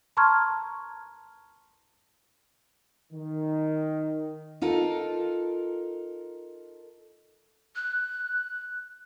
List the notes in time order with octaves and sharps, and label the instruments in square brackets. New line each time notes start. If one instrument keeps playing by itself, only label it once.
[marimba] A5 A#5 C6 C#6 F6 G#6
[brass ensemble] D#3
[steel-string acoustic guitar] D#4 F4 A4 A#4
[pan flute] F#6